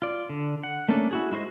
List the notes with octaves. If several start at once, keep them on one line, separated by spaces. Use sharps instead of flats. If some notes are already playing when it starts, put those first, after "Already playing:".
F4 D5
D3
F#5
A3 A#3 C#4 D4 A4
E4 F#4 G#4
G#3 E4 F#4 C5 D#5